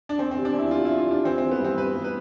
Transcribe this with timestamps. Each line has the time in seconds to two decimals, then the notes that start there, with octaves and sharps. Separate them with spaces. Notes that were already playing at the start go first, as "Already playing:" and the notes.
0.09 D4
0.18 E2 C4
0.31 C4
0.36 C3
0.45 D4
0.54 E2 E4
0.71 C3 F4
0.85 E4
0.89 E2
0.98 F4
1.06 C3 D4
1.25 E3 C4
1.38 E3 C4
1.51 B3
1.60 G2 C4
1.77 G2 B4
1.95 G2
2.04 B4